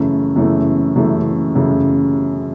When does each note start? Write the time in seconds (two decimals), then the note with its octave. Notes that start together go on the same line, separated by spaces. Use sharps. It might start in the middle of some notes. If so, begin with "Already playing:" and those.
Already playing: F#2 C#3 E3 A3
0.36 F#2 C#3 E3 A3
0.96 F#2 C#3 E3 A3
1.55 F#2 C#3 E3 A3